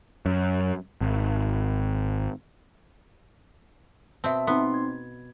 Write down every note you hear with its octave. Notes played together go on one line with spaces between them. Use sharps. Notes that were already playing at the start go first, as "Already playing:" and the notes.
F#2
G#1
B2 C4 E5 A5
B3 C4 D#4 C6
G#6